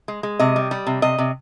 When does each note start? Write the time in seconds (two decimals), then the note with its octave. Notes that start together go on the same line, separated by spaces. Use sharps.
0.08 G#3
0.23 G#3
0.39 C3 D#5
0.56 G3
0.71 G3
0.87 C3
1.02 C3 D#5
1.18 C3